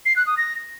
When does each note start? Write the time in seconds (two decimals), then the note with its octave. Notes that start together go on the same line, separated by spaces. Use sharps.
0.05 C7
0.16 F#6
0.27 D#6
0.37 A#6